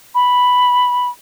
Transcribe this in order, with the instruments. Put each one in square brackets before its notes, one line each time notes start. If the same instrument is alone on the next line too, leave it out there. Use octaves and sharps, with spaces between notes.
[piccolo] B5